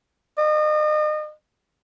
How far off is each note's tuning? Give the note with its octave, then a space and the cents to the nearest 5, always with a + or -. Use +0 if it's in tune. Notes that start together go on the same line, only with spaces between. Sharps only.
D#5 -35